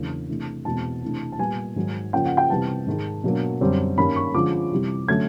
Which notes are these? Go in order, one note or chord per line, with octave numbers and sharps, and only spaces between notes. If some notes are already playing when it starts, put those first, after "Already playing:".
Already playing: E2 C#3 F#3 A#3 D4
C3 E3 A3 D4
E2 B2 G#3 C4 A5
C3 E3 A3 D4
A5
A#2 G3 B3 G#5
G#2 D#3 F#3
C#3 F3 A#3 C#4 G5
F#5
G5
C3 E3 G3 B3 A5
G#2 D#3 G#3
B2 F#3 A#3 D4
F#2 D3 G3 C4
G2 D#3 G3 A#3 C#4 B5
C#6
D3 F3 G#3 C#4 D6
C3 E3 G3
D3 F#3 A3 C#4 G#6